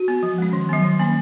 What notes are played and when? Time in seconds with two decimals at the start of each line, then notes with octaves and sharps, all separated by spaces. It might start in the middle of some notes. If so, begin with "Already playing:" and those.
Already playing: F#4
0.08 B3
0.23 F3
0.38 G#3 C#4
0.53 D#3
0.69 F#3 B3
0.85 D#3
0.99 A#3 C#4